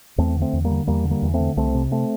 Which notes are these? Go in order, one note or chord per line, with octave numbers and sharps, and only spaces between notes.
E2 A3 C4
D3
A3 C4
E2
G3 A#3
D3
E2 G3 A#3
D3
G3 A#3
E2
A3 C4
D3
C2 A3 C4
C3
A3 C4